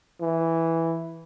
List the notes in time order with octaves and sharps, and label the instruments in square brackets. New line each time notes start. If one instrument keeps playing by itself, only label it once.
[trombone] E3